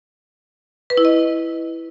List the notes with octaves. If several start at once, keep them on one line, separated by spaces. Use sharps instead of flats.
B4
E4
D#5